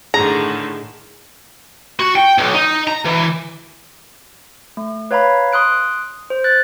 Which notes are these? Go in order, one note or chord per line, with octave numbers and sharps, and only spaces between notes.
A2 D3 D#3 G#4 A#5
F#4
G5
B1
D#4
A#5
E3
A3
B4 C#5 F5 A#5 B5
C6 D#6 F#6 D7
C5
F#6 A6